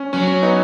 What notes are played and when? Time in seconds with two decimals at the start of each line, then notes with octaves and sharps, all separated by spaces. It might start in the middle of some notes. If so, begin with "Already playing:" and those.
Already playing: C#4
0.13 F#3 C#4
0.28 C#4
0.42 B3 D#4